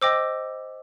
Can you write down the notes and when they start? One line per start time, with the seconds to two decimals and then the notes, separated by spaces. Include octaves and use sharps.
0.01 C5 D#5 G5 D6 E6